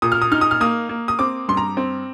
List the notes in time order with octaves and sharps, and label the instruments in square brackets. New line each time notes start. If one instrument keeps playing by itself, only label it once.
[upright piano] A#2 D#6
F6
D#6
D#4 F6
D#6
F6
A#3 D#6
A#3
D#6
C4 D6
G2 C6
A#5
C4